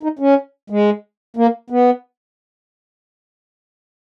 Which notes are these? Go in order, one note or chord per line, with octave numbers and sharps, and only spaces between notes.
D#4
C#4
G#3
A#3
B3